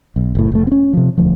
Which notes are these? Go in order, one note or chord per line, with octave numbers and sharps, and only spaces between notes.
B1
F#1 A2
F1 A3
C4 C#4
C3 F3
E1 D2 F3